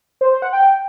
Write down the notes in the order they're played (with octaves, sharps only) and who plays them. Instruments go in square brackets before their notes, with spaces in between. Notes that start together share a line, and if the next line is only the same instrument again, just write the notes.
[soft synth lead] C5
C5
F#5
G5